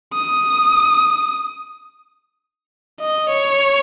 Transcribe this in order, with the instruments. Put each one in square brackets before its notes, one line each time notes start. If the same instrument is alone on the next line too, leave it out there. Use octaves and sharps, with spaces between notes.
[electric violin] D#6
D#5
C#5